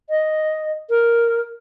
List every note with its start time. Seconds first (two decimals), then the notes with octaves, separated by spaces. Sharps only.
0.10 D#5
0.90 A#4